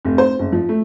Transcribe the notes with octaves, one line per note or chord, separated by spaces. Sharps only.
F1
C5
F#1
F3
A3